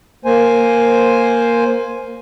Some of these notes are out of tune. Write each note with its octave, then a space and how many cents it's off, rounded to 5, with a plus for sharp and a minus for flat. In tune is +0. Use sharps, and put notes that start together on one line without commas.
A#3 +0 C5 +0 G#5 +0